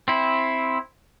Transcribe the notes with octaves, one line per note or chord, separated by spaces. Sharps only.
C4 E4